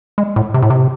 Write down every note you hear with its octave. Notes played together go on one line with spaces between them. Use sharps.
G#3
A2
C3
A2
C3